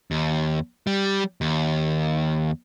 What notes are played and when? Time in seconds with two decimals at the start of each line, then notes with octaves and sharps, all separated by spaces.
0.11 D#2
0.87 G3
1.41 D#2